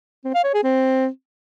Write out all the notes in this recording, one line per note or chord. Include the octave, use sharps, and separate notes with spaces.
C4
F5
C#5
G#4
C4